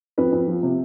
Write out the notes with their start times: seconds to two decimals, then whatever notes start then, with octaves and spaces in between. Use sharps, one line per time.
0.18 F2 B4
0.32 F2
0.48 F3
0.63 C3